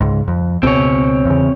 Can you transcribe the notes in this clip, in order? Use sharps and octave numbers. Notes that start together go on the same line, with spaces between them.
C#2 G#2
F2
C#2 B2 C4 C#5
E2 C#3